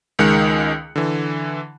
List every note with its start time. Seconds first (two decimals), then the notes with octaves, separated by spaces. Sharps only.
0.19 C#2 D#3 G#3 F#6 C#7
0.96 D3 E3